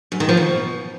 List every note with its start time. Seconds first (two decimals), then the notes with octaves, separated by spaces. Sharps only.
0.12 F#2
0.20 D#3
0.29 F3
0.37 B2